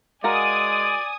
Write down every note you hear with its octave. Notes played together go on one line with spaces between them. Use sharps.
G#3 F#4 A#4 D5 F5 G#5 D#6